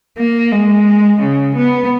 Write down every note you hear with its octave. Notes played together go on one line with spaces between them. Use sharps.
A#3
G#3
C#3
B3